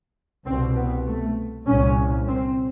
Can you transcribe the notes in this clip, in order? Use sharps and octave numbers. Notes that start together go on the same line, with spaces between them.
C2 B2 C4
B3
A3
C2 A#2 C#4
C4